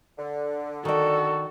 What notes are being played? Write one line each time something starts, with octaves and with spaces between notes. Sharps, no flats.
D3
D#3 F#4 A4 D5